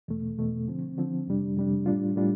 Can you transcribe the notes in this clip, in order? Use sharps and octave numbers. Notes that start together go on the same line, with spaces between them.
E2 B2 A3
E2 B2 A3
D3 F3 C4
D3 F3 C4
F2 C3 G3 D4
F2 C3 G3 D4
A2 G3 D4 F4
A2 G3 D4 F4